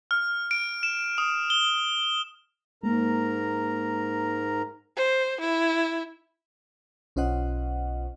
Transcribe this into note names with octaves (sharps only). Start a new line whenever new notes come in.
F6
D7
E7
D#6
G7
G#2 G#3 A#3 A#4 A#5
C5
E4
B1 C#4 F4 C5 D#5 F#5